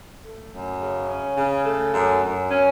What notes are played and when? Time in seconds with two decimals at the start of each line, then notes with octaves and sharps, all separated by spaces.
0.24 A3
0.52 F#2
0.80 C#3
1.09 C#4
1.36 C#3
1.65 A3
1.94 F#2
2.22 F#2
2.50 C#4